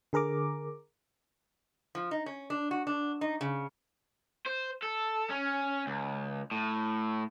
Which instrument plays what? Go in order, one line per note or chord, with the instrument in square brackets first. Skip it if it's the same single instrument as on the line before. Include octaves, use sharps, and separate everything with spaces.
[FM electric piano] D3 G#4 A#4 A#5 D6
[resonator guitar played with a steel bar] F3
D#4
C#4
D4
F#4
D4
D#4
C#3
[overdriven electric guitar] C5
A4
C#4
C#2
A2